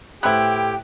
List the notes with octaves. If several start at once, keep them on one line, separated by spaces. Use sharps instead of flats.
A2 B3 E4 G4 C5 G5 F#6